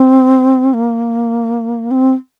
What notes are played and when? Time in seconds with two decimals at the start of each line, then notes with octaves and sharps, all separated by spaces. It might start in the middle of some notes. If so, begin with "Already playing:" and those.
Already playing: C4
0.73 A#3
1.91 C4